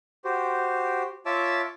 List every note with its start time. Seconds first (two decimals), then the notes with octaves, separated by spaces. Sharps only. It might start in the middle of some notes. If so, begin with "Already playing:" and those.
0.25 F#4 G4 C5
1.26 F4 C#5 E5 A5 D6 E6